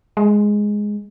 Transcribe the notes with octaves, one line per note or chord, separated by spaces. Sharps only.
G#3